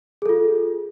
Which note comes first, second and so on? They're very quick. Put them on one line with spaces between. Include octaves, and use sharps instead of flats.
G#4 A4 F4